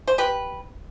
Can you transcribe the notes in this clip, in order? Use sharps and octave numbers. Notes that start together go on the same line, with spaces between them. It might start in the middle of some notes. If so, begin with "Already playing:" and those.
C5
G4 B4